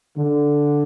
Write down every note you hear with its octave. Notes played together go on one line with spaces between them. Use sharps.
D3